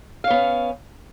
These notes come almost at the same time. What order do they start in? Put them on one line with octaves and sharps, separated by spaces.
F5 C#5 B3 C#4